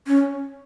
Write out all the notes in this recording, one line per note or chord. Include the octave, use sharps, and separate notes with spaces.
C#4